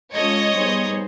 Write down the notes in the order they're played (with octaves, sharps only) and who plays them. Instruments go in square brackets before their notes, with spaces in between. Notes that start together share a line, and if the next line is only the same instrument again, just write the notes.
[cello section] G#3 C#4 F4 A4 [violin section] C#5 D#5
[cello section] G3 B3 D#4 G#4 C5